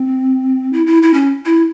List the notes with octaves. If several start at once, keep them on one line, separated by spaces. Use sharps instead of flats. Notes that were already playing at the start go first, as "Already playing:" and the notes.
Already playing: C4
E4
E4
E4
C#4
E4